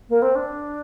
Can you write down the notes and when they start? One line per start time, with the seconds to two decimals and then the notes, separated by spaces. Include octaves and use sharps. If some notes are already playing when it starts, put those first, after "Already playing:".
0.09 A#3
0.22 C4
0.35 D4